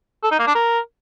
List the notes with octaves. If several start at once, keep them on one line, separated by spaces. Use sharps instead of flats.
A4
D#4
A#3
D4
A#4